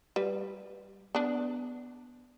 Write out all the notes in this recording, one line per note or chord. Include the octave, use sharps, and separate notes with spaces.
G3 B4
B3 D4